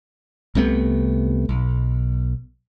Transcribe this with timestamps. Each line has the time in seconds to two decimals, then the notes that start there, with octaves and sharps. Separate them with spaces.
0.55 C2 C3 A3 B3
1.49 B1